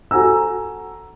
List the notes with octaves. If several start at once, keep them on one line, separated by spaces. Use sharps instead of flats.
F#4 A4 G#5 A#5 E6